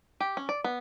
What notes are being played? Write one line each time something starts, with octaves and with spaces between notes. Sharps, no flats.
G4
C#4
D5
B3